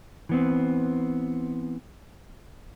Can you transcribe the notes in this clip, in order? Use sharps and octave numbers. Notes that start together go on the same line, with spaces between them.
E3 B3 C4